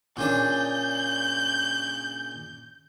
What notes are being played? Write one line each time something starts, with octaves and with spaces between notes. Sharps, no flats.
A#2 C#3 D4 G6